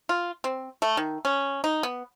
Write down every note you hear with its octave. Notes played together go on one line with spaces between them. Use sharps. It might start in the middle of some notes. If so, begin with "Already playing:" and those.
F4
C4
A3
D#3
C#4
D#4
B3